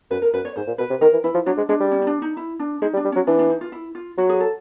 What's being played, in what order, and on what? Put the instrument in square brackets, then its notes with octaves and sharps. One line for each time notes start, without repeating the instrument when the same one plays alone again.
[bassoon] F#2 [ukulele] B4
[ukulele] A#4
[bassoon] F#2 [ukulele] B4
[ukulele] C#5
[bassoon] G#2 [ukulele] C5
[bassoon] A#2
[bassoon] B2 [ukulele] B4
[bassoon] C3
[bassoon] D#3 [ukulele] A#4
[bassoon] E3
[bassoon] E3 [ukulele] E4
[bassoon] F3
[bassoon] F#3 [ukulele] D4
[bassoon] G#3
[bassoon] G#3 [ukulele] D4
[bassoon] G3
[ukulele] C#4
D#4
D4
D#4
E4
D4
[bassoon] G#3 [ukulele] D#4
[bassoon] G3
[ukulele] D4
[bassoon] G3
[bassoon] F#3 [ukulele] C#4
[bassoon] E3 [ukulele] D4
[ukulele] D4
D#4
F4
E4
F4
[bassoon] F#3 [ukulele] F#4
[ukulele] G#4
A4